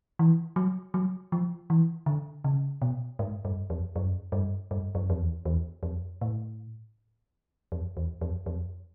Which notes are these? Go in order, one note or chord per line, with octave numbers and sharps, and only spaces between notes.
E3
F#3
F#3
F3
E3
D3
C#3
B2
G#2
G2
F2
F#2
G2
G2
F#2
F2
E2
E2
F2
A2
F2
E2
F2
F2